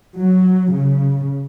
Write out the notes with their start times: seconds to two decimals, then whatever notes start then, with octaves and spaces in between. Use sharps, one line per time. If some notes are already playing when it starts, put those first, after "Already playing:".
0.18 F#3
0.74 C#3